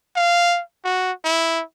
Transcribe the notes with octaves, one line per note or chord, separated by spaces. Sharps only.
F5
F#4
E4